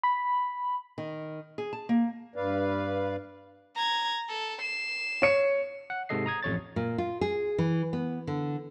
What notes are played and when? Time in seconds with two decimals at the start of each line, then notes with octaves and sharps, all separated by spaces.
0.03 B5
0.98 D#3
1.58 G#4
1.73 A5
1.89 A#3
2.36 G2 B4 D5 F5
3.75 A#5 G#6
4.28 A4
4.60 C7 E7
5.22 C#5 C#7
5.90 F#5
6.09 G#2 C3 G#3 A4 D#5 C7
6.26 A#5 D#6 G#6
6.43 A1 F2 C#5 A6
6.76 A#2
6.98 F4
7.21 G#4
7.58 E3
7.93 B3
8.27 D3